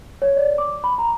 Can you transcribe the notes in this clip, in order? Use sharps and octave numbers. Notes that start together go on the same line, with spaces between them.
C#5
D5
D6
B5
A#5